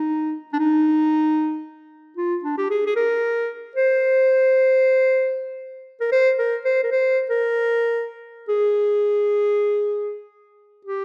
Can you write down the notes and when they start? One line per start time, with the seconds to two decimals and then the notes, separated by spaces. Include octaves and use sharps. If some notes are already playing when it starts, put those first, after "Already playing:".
Already playing: D#4
0.53 D4
0.59 D#4
2.17 F4
2.44 D4
2.58 G4
2.71 G#4
2.86 G#4
2.96 A#4
3.76 C5
6.01 A#4
6.12 C5
6.38 A#4
6.65 C5
6.84 A#4
6.92 C5
7.30 A#4
8.49 G#4
10.85 G4